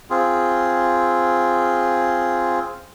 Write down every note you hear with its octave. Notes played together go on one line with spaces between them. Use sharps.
C4 F4 G#4